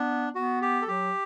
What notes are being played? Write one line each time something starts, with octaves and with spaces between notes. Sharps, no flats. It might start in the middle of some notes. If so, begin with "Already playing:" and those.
Already playing: B3 D4
B3 F#4
G4
A4
F#3 G4